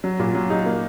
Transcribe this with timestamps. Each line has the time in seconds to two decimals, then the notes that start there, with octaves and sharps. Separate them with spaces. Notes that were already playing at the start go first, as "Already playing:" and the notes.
0.04 F#3
0.19 A#2
0.35 F#3
0.50 D#4
0.66 A#3